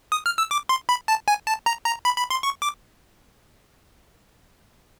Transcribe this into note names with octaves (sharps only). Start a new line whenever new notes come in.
D#6
F6
E6
D6
C6
B5
A5
G#5
A5
A#5
A#5
B5
B5
C6
C#6
D6